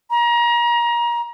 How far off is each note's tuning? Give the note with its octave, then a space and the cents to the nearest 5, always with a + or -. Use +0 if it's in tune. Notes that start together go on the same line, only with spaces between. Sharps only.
A#5 +30